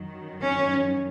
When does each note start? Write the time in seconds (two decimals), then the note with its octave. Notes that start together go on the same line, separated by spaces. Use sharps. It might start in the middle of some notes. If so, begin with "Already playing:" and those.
Already playing: F#2 D#3 F#3
0.42 C#4